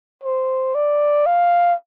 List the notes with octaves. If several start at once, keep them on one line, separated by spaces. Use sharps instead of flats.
C5
D5
F5